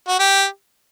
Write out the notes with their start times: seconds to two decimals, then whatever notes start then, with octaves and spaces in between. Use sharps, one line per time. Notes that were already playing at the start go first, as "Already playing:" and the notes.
0.08 F#4
0.19 G4